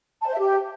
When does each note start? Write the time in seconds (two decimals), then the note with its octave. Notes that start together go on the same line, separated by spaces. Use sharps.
0.21 A5
0.27 C5
0.33 E5
0.39 G4